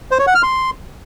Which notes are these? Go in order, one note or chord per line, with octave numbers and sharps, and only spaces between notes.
C5
C#5
F#5
F6
C6